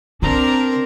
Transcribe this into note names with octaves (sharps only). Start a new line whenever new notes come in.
C#3 C4 D4 A#4 A#5 C6